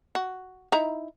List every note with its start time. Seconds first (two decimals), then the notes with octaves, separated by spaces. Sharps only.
0.15 F#4
0.72 D#4 E4 A#5